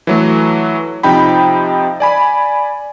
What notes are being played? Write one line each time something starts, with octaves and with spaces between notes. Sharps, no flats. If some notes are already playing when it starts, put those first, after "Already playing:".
E3 F#3 A3
C3 F3 D#4 G5 B5
D5 G#5 B5